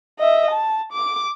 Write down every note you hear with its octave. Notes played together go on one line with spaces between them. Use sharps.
D#5 E5
A5
D6